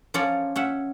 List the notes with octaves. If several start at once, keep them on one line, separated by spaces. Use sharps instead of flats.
F3 C#4 C#5 D5 A#5
C#4 E5 F#5